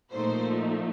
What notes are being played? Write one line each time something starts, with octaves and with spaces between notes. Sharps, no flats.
A#2 F3 A3 D#4 C5